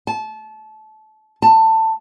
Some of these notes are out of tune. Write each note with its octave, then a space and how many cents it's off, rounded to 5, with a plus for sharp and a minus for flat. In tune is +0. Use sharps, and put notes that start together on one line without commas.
A5 -25
A5 +20